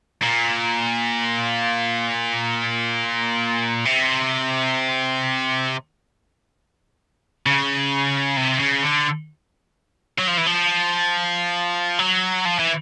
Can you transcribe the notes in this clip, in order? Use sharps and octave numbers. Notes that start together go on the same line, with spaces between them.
A#2
C3
C#3
C3
C#3
D3
F#3
F3
E3
F3
F#3
F3
E3